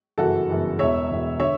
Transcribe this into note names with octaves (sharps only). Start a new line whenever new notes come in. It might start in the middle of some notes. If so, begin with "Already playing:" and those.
G1 F#2 C#3 E3 F#4 A4
G1 F#2 C#3 E3
E1 E2 B2 C#5 E5
E1 E2 B2
D3 C#5 E5